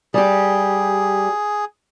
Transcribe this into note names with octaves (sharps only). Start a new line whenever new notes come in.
G3 G4 G#4